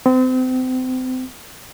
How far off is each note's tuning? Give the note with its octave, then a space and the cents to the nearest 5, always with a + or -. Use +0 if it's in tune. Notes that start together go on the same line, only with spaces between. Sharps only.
C4 -35